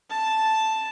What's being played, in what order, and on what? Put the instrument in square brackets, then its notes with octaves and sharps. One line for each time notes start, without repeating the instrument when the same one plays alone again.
[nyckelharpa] A5